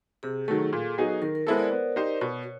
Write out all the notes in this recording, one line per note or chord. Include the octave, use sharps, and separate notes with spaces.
C3 G#4
D#3 F#3 A3 A4
A#2
F#3 B3 D#4 G#4
D#3 A#4
A#4
G#3 B3 E4 A4 C5
D5
B3
D#4 G4 C5
B2 C#5